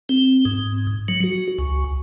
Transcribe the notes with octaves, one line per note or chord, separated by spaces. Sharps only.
C4
G#2
F#3
F#4
C#2